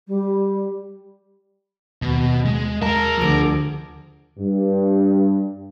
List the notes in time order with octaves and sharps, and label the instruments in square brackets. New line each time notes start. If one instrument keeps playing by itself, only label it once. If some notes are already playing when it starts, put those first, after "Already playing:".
[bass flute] G3
[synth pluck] D#2 [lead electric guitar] B2
[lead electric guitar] G#3
[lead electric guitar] G#4 A5 [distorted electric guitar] A#4
[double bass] D2 D3 [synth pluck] F3 D7
[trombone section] G2